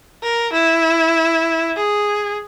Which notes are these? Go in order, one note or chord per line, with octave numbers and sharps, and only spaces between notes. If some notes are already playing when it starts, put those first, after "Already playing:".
A#4
E4
G#4